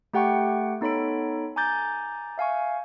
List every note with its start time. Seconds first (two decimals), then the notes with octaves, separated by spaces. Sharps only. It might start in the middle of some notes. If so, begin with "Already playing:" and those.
0.14 A3 G4 F#5 G5 C#6
0.81 B3 D#4 A4 C#5 B5 D7
1.56 G#5 A#5 D6 G6 A6
2.38 E5 F5 G#5 C#6